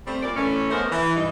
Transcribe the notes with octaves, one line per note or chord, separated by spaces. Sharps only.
G3 A3 C4
A#2 D5
A2 E3 A3 C#4
G#3 A3 B3 C#4 A#4 C5
E3
G2 D#4